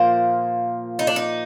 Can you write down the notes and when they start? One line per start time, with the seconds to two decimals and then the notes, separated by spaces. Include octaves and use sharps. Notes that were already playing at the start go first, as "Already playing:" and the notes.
Already playing: A#2 F3 A#3 C5
0.99 D#4
1.07 D4
1.16 D#4